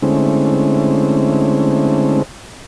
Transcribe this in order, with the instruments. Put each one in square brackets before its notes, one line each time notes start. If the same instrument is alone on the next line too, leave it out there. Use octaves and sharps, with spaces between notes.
[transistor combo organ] D3 G#3 A3 C4 C#4 E4